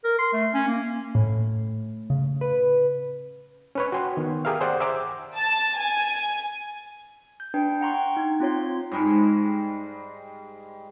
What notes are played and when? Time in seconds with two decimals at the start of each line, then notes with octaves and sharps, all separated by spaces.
0.04 A#4
0.19 C6
0.33 A3
0.54 C#4
0.67 A#3
1.15 A2
2.10 C#3
2.41 B4
3.75 C#4 B4 C#5
3.92 F#4 C#5 G5 G#5 C6
4.17 D#3 B3
4.45 G4 G#4 A#4 E5 F5
4.61 G#4 C5 D5 F#5 G5
4.80 C5 E5 G#5 A#5 D6
5.36 A5
5.78 G#5
7.40 G6
7.54 D4 B4 G5
7.81 F#5 A#5 C6 C#6
7.94 G5
8.17 D#4 G#6
8.40 C4 F4 C#5 C6
8.92 G#2 G3 G#3